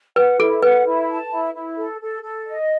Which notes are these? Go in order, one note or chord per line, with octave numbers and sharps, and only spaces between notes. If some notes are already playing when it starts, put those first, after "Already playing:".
B4 F#5
E4 A4
B4 F#5
E4
A5
E4
E4
A4
A4
A4
D#5